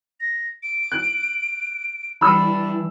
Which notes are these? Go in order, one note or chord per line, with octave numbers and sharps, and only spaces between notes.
A#6
D7
F#6
E3 G3 D4 B5 E6